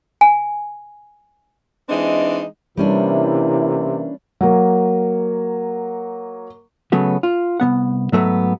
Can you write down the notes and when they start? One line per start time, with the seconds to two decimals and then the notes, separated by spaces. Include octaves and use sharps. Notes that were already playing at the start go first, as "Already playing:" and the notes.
0.21 G#5
1.89 E3 G#3 C4 D4 D#4
2.77 C3 E3 G3 A#3 C#4 D4 E4
4.41 F#3 A#3
6.92 C#3 F#3 A3 B3
7.23 F4
7.60 C2 A#2 B3 F#5
8.12 G#2 F#3 A3 B3